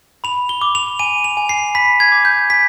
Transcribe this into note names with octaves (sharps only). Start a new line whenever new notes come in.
B5 F7
G7
D6
F7
G#5 D#7
F7
G#5
C7
B5 B6
G#6
D6
G6
G#5 B6